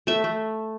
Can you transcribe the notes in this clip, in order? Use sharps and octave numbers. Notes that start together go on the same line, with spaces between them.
A3 E5
A3